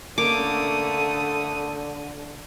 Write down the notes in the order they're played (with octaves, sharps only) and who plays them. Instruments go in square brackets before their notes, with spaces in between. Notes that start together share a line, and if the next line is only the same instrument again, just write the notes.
[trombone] D3 [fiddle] A3 D#6 [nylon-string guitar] A#3 C#4 D4 [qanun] D6